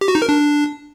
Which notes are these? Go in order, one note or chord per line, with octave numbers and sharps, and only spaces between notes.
G4
F#4
D#4
A#4
D4